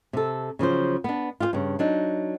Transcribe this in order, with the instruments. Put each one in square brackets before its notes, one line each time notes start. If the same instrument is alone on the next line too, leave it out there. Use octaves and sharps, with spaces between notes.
[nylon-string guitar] C3 A4
C#3 F3 F#3 C5
B3 D4
F4 G4 C5
G2 C#3
F#3 D4 D#4